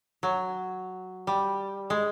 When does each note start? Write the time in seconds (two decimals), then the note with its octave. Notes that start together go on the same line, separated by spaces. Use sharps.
0.23 F#3
1.27 G3
1.90 G#3